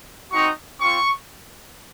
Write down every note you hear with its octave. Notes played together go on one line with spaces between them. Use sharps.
C4 D#4 F#4 C#6
C4 F4 C#6